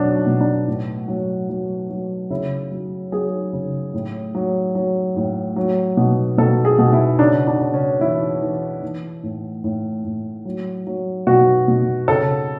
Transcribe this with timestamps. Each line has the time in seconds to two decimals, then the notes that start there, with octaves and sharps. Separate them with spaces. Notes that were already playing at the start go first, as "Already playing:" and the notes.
Already playing: B2 F#3 D4
0.26 B2
0.41 D4
0.68 A2
1.08 F#3
1.49 F#3
1.90 F#3
2.30 C#3 E4
2.71 F#3
3.12 F#3 G#4
3.53 C#3
3.94 A2
4.35 F#3
4.75 F#3
5.16 A2
5.56 F#3
5.97 B2
6.38 B2 A4
6.65 G#4
6.78 B2
6.93 E4
7.19 C#3 D4
7.47 D4
7.60 C#3
7.74 C#4
8.01 E3 E4
8.42 E3
8.83 E3
9.23 A2
9.64 A2
10.04 A2
10.45 F#3
10.87 F#3
11.27 B2 F#4
11.68 B2
12.08 C#3 A4